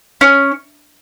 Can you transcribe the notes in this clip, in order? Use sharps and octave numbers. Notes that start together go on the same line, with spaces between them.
C#4